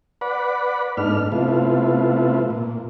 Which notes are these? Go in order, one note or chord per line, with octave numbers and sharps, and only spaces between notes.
B4 D5 F#5 B5
G#2 A3 B3 D4 D#4 F6
C3 A3 B3 E4 F4
A#2